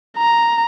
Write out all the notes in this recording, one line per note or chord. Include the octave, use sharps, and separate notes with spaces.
A#5